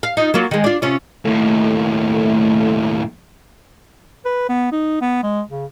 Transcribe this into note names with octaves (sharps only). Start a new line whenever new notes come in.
F5
D#4 F4
F#3 A#3 F4
D#3 G#3
D4 F4
C3 C#4 F4
D#2 A2 A3
B4
B3
D#4
B3
G#3
C#3